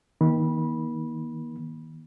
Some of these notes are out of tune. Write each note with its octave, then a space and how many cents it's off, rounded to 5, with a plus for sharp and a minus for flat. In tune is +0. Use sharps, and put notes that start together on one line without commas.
D#3 +30 A#3 +35 B5 -20